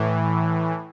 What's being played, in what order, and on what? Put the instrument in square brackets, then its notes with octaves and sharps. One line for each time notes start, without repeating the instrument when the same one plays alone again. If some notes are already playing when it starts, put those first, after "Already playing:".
Already playing: [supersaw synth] A2 E3